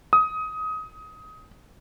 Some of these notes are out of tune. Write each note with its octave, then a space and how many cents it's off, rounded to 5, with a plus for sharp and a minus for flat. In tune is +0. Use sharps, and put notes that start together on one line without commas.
D#6 +20